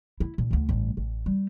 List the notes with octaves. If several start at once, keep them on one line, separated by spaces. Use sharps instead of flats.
E4
A#2
D2 D3
A1 G2
A1
G3